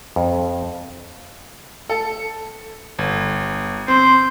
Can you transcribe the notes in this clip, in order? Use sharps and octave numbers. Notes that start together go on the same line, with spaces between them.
F2
A4
G1
C4 C5